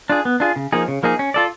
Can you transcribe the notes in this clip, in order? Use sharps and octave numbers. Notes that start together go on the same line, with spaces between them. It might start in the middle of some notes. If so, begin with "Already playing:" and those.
D4 F4 G#4
B3
D4 F4 G#4
C#3
F3 A#3 D#4 G#4
C#3
F3 A#3 D#4 G#4
C#4
F4 A4 D5